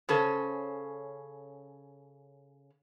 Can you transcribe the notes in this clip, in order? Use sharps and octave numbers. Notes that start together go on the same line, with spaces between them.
C#3 C#4 A4 C5